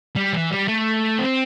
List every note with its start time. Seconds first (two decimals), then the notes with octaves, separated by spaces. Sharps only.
0.16 G3
0.33 E3
0.51 G3
0.68 A3
1.19 C4